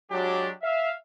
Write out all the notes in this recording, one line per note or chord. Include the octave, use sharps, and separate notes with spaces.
F#3 G#3 D4 G4
E5 F5